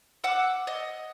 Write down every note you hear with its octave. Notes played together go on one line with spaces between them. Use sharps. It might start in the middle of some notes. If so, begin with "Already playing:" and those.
F#5 D6 E6
D#5